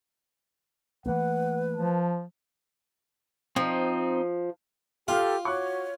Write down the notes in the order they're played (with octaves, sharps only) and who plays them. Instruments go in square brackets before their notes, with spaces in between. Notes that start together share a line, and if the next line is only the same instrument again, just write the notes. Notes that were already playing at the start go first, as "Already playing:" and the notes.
[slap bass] E3 A3 A#3 [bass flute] B4 [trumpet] F#5
[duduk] F3 [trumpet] A5
[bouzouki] F3 [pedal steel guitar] C4 D#4
[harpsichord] F4 [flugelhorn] G4 [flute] A4 [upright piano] F5 G5 F6
[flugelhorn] F#4 [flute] C#5 [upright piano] C#6 D6 F#6